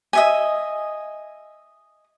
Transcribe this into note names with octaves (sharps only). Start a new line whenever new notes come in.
D#5 E5 G#5